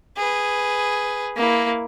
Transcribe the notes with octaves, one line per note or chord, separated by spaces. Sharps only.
G#4 B4
A#3 E4